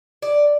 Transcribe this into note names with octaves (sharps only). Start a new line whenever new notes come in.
D5